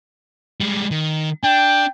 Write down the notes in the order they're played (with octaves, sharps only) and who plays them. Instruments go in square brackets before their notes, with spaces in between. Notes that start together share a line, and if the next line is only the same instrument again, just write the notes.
[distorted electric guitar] G3 G#3
D#3
[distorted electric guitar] D4 [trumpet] G5